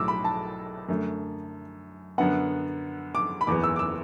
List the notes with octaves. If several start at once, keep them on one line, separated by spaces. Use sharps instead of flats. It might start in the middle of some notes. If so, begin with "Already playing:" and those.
Already playing: B1 A2 F#3 A3 D6 E6
B5
A5
F#2 D3 A3
F#2 D3 B3 F#5
D6
B5
F#1 E2 E3 B3 D6
E6
D6
E6